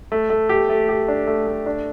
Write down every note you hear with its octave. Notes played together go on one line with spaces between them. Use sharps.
A3
A3
G4
A3
G4
D4
A3
A3
D4